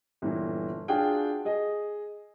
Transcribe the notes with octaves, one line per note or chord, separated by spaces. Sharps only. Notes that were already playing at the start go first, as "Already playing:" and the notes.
G1 A#2 E3
D4 F4 F#4 G#4 G5
G#4 D#5